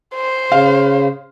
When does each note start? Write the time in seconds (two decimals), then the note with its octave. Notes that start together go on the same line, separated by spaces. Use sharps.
0.15 C5
0.52 C#3 F5